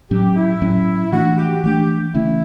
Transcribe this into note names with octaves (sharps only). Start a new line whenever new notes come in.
A2 F#3 C#4 G4
E4
A2 F#3 C#4
E3 A3 D4 F#4
G4
E3 A3 D4 G4
C#3 E3 A3 C#4 E4